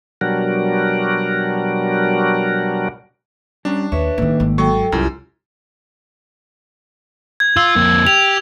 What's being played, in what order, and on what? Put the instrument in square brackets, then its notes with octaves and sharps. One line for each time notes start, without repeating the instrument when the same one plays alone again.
[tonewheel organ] B2 F#3 G3 D4 F#4 A#4
[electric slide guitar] G3 C#4 A#5 [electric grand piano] D4
[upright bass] D#2 [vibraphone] B4 E5 [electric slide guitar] C#5
[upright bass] A2 C#4 [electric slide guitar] D#3 A3 A#3
[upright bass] G#1
[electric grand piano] F#3 C#6 [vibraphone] A4 G5
[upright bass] C2 [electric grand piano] F#2 [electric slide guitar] F#3 A#4 [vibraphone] E4 F4 G4
[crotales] G#6
[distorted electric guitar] F4 [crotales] E6
[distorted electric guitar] F2 A#3
[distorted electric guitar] G4 [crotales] F7